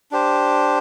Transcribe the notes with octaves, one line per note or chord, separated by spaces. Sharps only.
D4 G4 C5